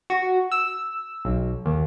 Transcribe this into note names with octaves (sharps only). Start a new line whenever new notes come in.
F#4
E6
B1
D#2